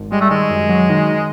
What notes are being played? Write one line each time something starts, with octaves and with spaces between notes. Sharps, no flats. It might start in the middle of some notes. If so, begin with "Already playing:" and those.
Already playing: G#1
G3 G#3
A3
D#3 G#3
F#2
F#3
D#3